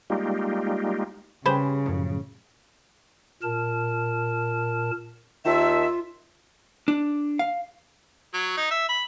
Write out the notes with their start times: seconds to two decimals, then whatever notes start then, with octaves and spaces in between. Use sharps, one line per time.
0.10 G3 G#3 A#3 D#4 F4 G4
1.46 C#3 G3 G4 G#4 B4 C5
1.86 F#2 A2 F3
3.43 A#2 A#4 A5
5.45 D#2 D#3 F4 E5 A5
6.88 D4
7.39 F5
8.34 F#3
8.57 D#4
8.71 E5
8.89 B5